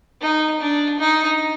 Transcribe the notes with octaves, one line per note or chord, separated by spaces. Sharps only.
D#4
D4
D#4